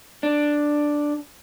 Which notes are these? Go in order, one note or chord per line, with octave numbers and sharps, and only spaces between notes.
D4